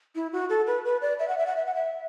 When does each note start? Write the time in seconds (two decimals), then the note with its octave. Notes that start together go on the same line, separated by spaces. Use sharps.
0.15 E4
0.33 F#4
0.49 A4
0.67 B4
0.85 B4
1.02 D5
1.19 E5
1.28 F#5
1.38 E5
1.47 F#5
1.56 E5
1.66 F#5
1.75 E5